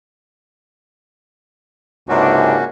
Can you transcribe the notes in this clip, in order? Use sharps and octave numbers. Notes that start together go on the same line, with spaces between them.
C#2 G#2 C3 A#3 C#4 D4 F#4